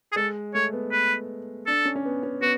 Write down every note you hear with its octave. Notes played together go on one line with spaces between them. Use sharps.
G#4
G#3 A4
A3 C#5
B3
B4
D4 A4
C#4
C#4
B3
C#4
B3 F#4